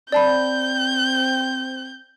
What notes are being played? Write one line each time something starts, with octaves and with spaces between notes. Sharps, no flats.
C4 D5 A5 B5 G6